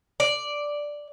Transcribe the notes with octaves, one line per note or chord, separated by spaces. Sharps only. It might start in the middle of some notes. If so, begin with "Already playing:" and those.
D5